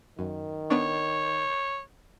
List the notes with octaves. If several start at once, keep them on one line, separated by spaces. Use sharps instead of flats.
F#2 D#3
B3 D4 C#5